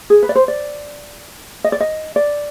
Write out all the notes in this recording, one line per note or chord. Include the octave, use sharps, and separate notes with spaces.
G#4
B4
D5
C5
D5
D#5
D5
D#5
D5